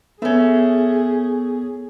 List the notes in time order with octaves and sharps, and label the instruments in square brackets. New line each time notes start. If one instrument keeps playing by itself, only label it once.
[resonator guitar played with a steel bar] A3 C#4 [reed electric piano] B3 [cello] G#4